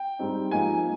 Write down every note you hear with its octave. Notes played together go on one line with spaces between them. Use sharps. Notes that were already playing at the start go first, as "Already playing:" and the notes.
Already playing: G5
G#2 G3 C4 D#4
G#2 F3 A#3 D#4 G#5